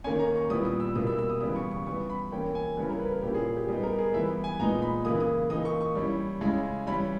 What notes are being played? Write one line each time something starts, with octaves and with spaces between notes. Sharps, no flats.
D#3 A#3 C#4 G#5
A#5
C#6
A#2 G3 B3 E4 D#6
D#6
E6
B2 G3 A#3 E4 D#6
E6
E6
D#6
C#3 E3 G3 B3 E4 D#6
C#6
C#6
E3 G3 B3 C#6
B5
E3 A#3 C#4 E4 G5
G#5
C#3 G3 C#4 E4 B4
A#4
B4
A#4
A#2 A#3 C#4 E4 G4
G#4
G#4
G4
G3 B3 D#4 G#4
A#4
G#4
E3 G3 B3 E4 E5
G#5
A#2 G#3 B3 D#4 A#5
B5
C#3 E3 A#3 E4 D#6
D#6
E3 A#3 D#4 D#6
C#6
C#6
G3 C#4 E4
C#3 G#3 C#4 E4
E3 G3 C#4 E4 B5